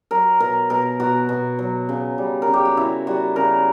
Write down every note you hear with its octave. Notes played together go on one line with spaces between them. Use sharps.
F#3 A#4
B2 A#4
B2 A#4
B2 F#4
B2
F#3
C#3
G3
A#4
C#3
G4
F#4
C#3 E4
G3 F#4
C#3 A#4